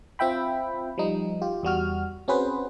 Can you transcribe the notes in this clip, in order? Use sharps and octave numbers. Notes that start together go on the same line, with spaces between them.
C4 F4 E5 G5 B5
F3 G3 D#4
F4 G4
E2 G3 F#4 F6
C4 C#4 F#4 G#4 B4 C5